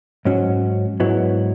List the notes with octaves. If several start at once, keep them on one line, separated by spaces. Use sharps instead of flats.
G#2 F#3 C#4
G#2 F#3 B3 E4